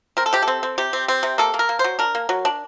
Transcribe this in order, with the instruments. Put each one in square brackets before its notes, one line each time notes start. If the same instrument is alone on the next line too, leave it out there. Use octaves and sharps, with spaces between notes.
[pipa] C4 A#4
A4
C3 G4
A4
C4
C4
C3 G4
C4
C4
C3
A#3 A4
A#3
A#4
A#3
C5
F#3
D4 A#4
A#3
F#3
D4